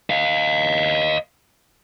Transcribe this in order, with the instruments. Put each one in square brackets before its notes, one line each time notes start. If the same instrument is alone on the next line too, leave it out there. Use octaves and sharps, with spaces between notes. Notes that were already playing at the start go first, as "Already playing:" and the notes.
[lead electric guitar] D#5 F5